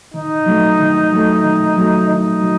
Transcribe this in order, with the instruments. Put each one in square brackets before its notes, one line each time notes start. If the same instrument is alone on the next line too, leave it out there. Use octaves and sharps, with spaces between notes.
[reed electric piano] D#3 [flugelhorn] D#4
[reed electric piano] F#3 A3
D#3
F#3 A3
D#3
F#3 A3
[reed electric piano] D#3 [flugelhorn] D#4
[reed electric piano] F#3